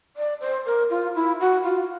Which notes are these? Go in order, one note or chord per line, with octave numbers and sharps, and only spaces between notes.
D5
C5
A#4
F4
E4
F#4
F4